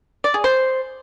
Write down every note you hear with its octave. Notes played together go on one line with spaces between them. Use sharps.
D5
G#4
C5